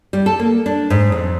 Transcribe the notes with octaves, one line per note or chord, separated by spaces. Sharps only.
G3
A4
A#3
D4
G#2
F2